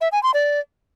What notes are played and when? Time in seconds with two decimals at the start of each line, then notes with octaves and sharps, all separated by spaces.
0.01 E5
0.12 G#5
0.23 C6
0.34 D5